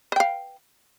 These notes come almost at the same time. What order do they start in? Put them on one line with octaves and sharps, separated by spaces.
B4 G5 F5